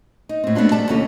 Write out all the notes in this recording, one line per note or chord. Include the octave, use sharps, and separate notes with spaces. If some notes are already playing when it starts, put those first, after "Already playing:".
D#4
A2 C4
A3 B3 C4 D4 F4
G3 D5 A5
D#2 C3 C#4 F4 A4